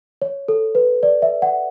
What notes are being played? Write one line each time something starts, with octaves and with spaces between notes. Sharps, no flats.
C#5
A4
B4
D5
E5
F#5